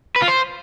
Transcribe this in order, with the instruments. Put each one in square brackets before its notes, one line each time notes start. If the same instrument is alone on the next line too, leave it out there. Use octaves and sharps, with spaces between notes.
[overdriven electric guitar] B4
F4
C5